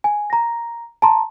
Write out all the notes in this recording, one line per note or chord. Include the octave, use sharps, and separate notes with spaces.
G#5
A#5 A#6
A5 A#5 C6